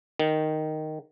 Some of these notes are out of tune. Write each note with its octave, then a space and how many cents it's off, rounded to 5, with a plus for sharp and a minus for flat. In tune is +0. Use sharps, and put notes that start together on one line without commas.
D#3 -5